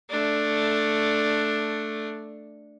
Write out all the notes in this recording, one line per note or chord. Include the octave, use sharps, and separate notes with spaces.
A3 D4